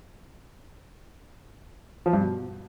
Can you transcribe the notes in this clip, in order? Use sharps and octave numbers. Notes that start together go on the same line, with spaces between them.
F3
G2
B2